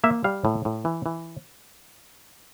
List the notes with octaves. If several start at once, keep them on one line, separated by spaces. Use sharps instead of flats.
A#3 E5
G3 F5
A2
A2
E3
E3